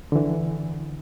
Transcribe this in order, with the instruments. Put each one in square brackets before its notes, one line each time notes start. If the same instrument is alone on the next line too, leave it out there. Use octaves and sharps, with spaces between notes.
[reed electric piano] D3 E3